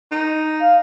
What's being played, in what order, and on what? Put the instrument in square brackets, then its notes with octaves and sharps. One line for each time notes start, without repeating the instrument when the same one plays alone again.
[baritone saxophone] D#4
[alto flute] F5